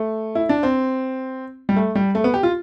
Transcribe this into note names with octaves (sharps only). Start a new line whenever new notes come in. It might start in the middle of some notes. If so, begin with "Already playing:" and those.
Already playing: A3
E4
D4
C4
G3
A3
G3
A3
B3
G4
F4